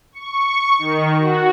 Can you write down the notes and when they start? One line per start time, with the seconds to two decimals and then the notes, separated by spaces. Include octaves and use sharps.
0.12 C#6
0.79 D#3
1.18 F#4